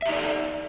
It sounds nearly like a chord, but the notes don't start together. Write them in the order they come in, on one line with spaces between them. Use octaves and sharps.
E5 G4 D#4 D5 A4